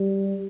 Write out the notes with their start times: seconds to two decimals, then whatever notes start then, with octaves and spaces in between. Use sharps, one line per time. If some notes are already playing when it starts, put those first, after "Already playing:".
Already playing: G3